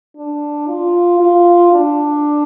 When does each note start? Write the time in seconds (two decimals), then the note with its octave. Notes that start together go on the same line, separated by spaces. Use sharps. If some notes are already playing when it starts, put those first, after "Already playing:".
0.16 D4
0.67 F4
1.20 F4
1.72 D4